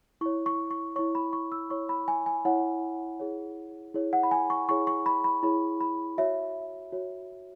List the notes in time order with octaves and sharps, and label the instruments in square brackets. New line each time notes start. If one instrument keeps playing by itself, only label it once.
[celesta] E4 C#5 C#6
C#6
C#6
E4 C#5 C#6
B5
C#6
E6
E4 C#5 C#6
B5
G#5
G#5
E4 C#5 F#5
E4 G#4 C#5
E4 G#4 C#5
F#5
B5
G#5
C#6
E4 G#4 C#5 C#6
C#6
B5
B5
E4 G#4 C#5 B5
B5
F#4 C#5 E5
F#4 C#5